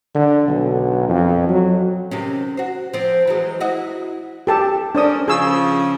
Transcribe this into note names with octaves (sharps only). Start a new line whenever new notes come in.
D3
B1
F2
F#3
C3 D#3 C#4
F#4 C5
F3 C4
E3 F#3 G#3
E4 F#4 D#5
G4 A4 A5
C#4 D4 A#4 C5 D5 D#6
C#3 F3 G#4 E6